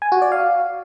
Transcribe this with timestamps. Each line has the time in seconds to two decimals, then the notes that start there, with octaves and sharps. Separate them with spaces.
0.02 G#5
0.12 F#4
0.22 D5
0.32 F5